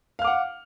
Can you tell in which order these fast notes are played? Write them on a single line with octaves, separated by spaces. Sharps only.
F5 F6 D6 F#5